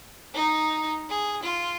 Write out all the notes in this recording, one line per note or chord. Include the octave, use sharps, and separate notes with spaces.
D#4
G#4
F4